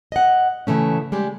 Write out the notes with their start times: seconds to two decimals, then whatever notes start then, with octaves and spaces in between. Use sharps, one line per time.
0.12 D#5 F#5
0.67 C#3 E3 A3 C#4
1.12 G3 G#3 G4